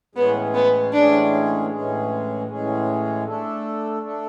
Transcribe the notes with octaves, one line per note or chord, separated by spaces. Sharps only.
A2 E3 G#3 B3 C#4 G#4
B3
A2 E3 G#3 C#4 D4 G#4
A2 E3 G#3 C#4 G#4
A2 E3 G#3 C#4 G#4
A3 D4 A4
A3 D4 A4